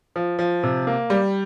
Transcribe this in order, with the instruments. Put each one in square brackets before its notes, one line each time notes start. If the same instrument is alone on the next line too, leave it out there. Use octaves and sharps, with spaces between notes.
[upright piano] F3
F3
C3
A#3
G3